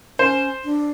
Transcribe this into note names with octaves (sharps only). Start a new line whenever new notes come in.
C#4 C5
D4